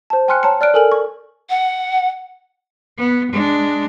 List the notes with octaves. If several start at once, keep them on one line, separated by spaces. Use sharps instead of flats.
C5 A5
G5 G#5 C6 F6 F#6 C#7
C#5 A5 A#5 C#7
D5 F6 F#6 D7
A4 A#4 G#5 F6 F#7
C#6
F#5
B3
G#3 D4